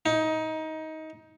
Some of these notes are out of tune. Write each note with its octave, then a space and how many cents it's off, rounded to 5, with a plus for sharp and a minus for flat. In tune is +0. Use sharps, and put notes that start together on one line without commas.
D#4 +20